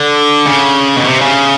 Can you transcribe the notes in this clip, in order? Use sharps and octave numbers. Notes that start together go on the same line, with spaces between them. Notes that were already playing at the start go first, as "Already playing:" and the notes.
Already playing: D3
C#3
B2
C3
C#3